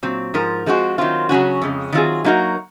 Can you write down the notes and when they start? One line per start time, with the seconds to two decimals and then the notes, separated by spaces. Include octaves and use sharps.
0.03 A#2 F#3 C4
0.34 G#2 F3 A#4
0.66 F3 G#3 C4 F#4
0.98 D#3 F#3 C4 F4
1.29 C#3 F#3 C#4 F#4
1.61 F2 C#3 G#3
1.92 D#3 F#3 C4 F4 G#4
2.24 F#3 A#3 D#4 F#4 A#4